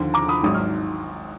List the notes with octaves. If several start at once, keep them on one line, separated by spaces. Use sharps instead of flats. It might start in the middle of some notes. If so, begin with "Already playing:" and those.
Already playing: D#2 D3 F3
A#5 D6
B5 D#6
G#1 G#2 D#3 F#3 D#6
F6